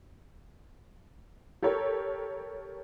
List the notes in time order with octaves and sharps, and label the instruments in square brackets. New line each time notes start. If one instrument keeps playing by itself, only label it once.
[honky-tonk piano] G4 A4 A#4 C#5